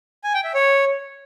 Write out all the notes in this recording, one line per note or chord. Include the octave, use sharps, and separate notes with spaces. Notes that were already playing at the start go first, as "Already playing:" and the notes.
G#5
G5
E5
C#5